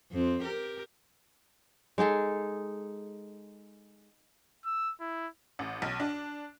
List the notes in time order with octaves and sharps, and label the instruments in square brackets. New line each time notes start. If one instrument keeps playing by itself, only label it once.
[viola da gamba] F2 C4
G4 A#4
[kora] G#3 D#4 G#4 A4
[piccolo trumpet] E6
E4
[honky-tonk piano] A1
B1
D4